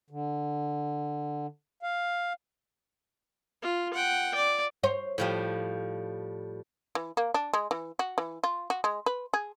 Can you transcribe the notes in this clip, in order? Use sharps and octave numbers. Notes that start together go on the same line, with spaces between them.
D3
F5
F4
F#5 G5
D5
C5 C#5
A2 F3 G3
E3
A#3
D4
G#3
E3
F#4
E3
F4
F#4
G#3
B4
G#4